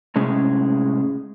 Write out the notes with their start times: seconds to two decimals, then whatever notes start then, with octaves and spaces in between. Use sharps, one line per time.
0.16 A2 C3 G#3 C#4